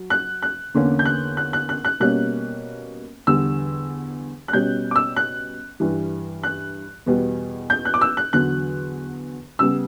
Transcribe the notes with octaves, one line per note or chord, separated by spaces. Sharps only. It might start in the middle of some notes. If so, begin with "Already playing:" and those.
Already playing: F#3
F#6
F#6
E2 D3 A#3 C#4
G6
F#6
F#6
F#6
F#6
F#6
B2 G3 A#3 C#4 F#6
E2 D3 G3 E6
F#6
B2 G3 C#4 G6
D6
E6
F#6
G2 E3 G3
F#6
E2 B2 G3 B3
G6
F#6
D6
E6
F#6
E2 D3 F#3 F#6
C#3 G3 B3 E6